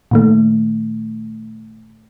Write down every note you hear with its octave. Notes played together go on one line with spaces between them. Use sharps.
A#2 D#3 A3